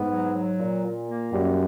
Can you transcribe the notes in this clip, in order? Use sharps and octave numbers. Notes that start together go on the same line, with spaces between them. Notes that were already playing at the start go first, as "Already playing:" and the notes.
Already playing: G#2 B3
F#3
F#3
A#2
A#2
A#3
F#2 G3